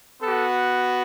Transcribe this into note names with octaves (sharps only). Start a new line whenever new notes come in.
B3 F#4 A4